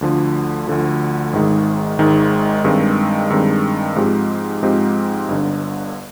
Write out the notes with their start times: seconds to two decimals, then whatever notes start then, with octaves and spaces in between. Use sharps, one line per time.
0.01 D2 D3 F3
0.67 D2 D3 F3
1.33 G#1 G#2 D#3 G#3
1.98 G#1 G#2 D#3 G#3
2.64 G2 D#3 G#3 C4
3.30 G2 D#3 G#3 C4
3.96 G#2 F3 G#3 C4 G4
4.63 G#2 F3 G#3 C4 G4
5.28 G1 G2 D3